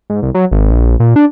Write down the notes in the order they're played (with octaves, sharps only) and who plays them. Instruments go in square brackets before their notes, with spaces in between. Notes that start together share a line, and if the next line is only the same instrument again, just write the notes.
[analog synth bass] G#2
C2
F#3
G#1
A#1
A#2
D4